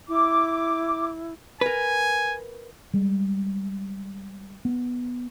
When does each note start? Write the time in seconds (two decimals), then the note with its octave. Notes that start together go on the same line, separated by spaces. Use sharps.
0.09 E4 D6
1.61 A#4 B4 G#5
2.94 G3 G#3
4.65 B3